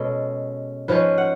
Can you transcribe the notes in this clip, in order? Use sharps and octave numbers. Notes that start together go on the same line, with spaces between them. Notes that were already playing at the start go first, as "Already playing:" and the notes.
Already playing: B2 G#3 C#4 A4
G#2 F3 G#3 C#4 B4
F#5